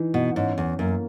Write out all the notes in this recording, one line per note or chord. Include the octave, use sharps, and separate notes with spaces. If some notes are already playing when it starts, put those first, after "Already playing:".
Already playing: E3 D#4
B2
G#2 C#4
E2
F#2 A#3